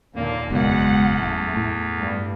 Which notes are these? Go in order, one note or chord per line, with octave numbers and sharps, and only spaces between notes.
D#2 A#2 D3 A#3
F#1 E2 B2 G#3 F#5
F#2 A2 A3
A2
G2